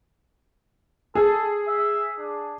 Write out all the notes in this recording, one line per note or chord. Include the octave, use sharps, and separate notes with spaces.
G#4 A4
E5
D4